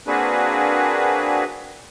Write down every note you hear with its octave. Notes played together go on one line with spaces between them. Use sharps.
A#3 C4 D4 F#4 G#4 B4